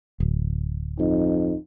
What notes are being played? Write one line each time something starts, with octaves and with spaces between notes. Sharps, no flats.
D1
F2 D#4